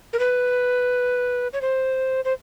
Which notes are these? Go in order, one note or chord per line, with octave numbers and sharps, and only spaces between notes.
A#4
B4
C#5
C5
C5